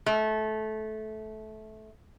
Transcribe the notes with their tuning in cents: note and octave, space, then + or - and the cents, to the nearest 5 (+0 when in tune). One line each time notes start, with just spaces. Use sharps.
A3 -20